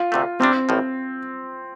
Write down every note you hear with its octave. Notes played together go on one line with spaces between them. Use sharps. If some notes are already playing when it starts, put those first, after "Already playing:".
Already playing: F4
D2 C3 A3
C3 G3 C4 D4
A1 A2 F3